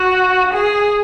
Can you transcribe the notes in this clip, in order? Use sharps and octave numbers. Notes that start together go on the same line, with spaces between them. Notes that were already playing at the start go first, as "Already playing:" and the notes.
Already playing: F#4
G#4